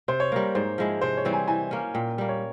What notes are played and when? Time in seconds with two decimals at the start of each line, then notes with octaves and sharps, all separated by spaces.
0.08 C3 C5
0.20 C#5
0.32 G3 A#3 A#4
0.55 G#2 C5
0.78 F3 G#3 E4
1.01 C3 C5
1.17 C#5
1.25 E3 G3 C4
1.33 G#5
1.48 E3 G#5
1.71 A#3 C#4
1.94 A#2 G5
2.18 G3 A#3
2.29 C#5